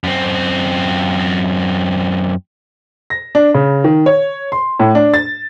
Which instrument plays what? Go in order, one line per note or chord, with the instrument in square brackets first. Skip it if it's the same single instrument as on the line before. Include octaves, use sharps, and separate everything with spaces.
[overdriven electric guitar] F#2 C4
[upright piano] A#6
D4
C#3
D#3
C#5
C6
A2
D4
A6